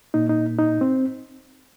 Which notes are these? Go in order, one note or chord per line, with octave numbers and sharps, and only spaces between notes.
A#2 A#3 D#4
D#4
D#4
C4